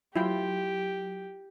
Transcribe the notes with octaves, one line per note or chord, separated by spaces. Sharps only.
F#3 E4 F4 G4 G5